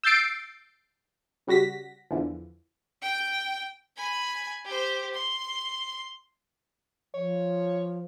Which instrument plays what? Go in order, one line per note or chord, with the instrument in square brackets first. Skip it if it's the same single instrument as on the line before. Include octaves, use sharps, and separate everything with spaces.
[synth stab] E6 G6 A6 C7 D7
C#3 G3 F#4 A#6 B6
E2 D3 E3 F3
[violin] G5
[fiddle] G#5 B5
G4 C5
C6
[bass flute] F3 [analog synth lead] C#5